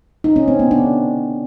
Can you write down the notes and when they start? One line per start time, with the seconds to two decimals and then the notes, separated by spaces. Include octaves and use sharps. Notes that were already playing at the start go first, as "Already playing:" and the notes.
0.24 D#4
0.36 C#4
0.48 C4
0.59 B3
0.71 D4